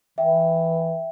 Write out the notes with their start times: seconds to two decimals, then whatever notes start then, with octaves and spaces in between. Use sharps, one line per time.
0.18 E3 E5 G5